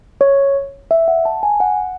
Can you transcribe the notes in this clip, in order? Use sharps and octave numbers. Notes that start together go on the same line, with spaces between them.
C#5
E5
F#5
A5
G#5
F#5